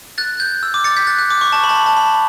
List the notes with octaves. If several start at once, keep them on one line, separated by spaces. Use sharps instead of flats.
F#6 A6
G6
E6
D6
A6 C#7
G6 B6
F#6 A6
F#6
D6
C#6
A5
B5
A5
B5
A5
B5